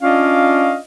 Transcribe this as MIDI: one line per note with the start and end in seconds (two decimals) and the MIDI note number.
0.02 0.78 61
0.02 0.78 62
0.02 0.78 65
0.02 0.78 74
0.02 0.78 75
0.02 0.78 77